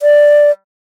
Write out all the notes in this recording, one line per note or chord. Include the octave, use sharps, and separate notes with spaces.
D5